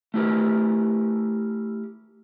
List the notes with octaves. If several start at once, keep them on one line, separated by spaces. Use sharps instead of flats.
A3 E4 G4 A#4